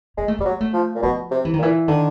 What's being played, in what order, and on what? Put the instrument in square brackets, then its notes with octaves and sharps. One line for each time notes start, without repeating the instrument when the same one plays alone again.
[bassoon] G#3 [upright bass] A#3
[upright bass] A3
[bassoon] G3 [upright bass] A#3
[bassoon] F#3
[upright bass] A3
[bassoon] F3
A#2
[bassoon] B2 [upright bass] F3
[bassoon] C3
[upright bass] E3
D#3
[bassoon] A#2
[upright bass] E3
[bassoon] D3 [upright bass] D#3